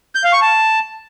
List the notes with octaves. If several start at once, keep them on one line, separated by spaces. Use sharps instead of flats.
G6
F5
C#6
A5